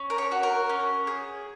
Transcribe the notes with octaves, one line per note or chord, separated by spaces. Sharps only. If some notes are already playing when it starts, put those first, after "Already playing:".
Already playing: C#4
A#4
C#5
F#4
A#4
C#4
G#4